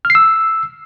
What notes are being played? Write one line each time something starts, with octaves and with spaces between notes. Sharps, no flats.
F6
C7
E6